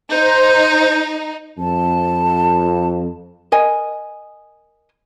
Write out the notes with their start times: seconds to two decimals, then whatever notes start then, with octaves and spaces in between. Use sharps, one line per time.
0.11 D#4 C5 G6
1.59 F2 A5
3.52 A#4 D#5 G#5